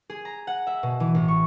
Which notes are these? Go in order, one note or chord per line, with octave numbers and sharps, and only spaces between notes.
G#4
A#5
F#5
E5
B2
E3
A1
C#6